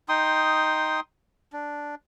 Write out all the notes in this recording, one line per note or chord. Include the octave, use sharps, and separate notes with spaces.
D#4 G5 C6 D#6
D4